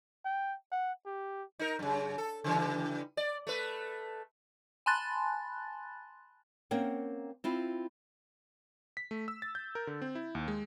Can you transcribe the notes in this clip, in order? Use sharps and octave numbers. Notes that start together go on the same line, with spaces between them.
G5
F#5
G4
D#4 A#4
F#2 C#3
A4
C#3 E3 G3
D5
A3 B4
G#5 A5 B5 C6 F#6 A6
A#3 C4 C#4 A#4 F#5 G5
C4 E4 F4
B6
A3
E6
A6
G6
A#4
D3
C4
E4
D#2
G#3